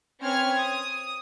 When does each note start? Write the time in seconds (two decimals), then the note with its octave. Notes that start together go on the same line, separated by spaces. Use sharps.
0.22 C4 C#4 B4 C#5 F6 G#6
0.59 D#6